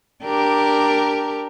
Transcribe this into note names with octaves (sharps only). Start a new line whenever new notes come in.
D4 G4 A#4